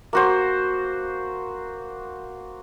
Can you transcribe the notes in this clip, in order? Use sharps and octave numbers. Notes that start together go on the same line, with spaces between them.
A#3 F#4 C5